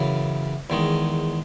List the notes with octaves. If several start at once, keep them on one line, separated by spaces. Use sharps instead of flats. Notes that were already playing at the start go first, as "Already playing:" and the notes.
Already playing: F#2 C#3 E3
E2 D#3 G#3